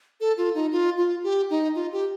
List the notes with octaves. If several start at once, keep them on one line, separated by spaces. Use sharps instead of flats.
A4
F4
D#4
F4
F4
G4
D#4
F4
G4